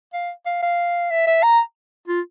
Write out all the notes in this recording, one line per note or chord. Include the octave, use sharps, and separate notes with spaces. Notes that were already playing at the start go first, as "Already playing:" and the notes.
F5
F5
F5
E5
E5
A#5
F4